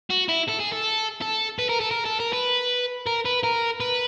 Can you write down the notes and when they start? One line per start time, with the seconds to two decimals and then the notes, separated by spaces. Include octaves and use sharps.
0.10 F#4
0.28 E4
0.48 A4
0.59 G#4
0.72 A4
1.21 A4
1.59 B4
1.69 A#4
1.80 A4
1.91 A#4
2.05 A4
2.19 A#4
2.33 B4
3.07 A#4
3.26 B4
3.44 A#4
3.80 B4